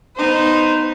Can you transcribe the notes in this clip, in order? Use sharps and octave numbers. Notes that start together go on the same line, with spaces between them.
B3 D#4 C5